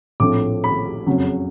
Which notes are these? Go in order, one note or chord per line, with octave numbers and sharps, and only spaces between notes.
A#1 A2 F3 A3 C4 D6
B5
F#1 F2 C#3 F#3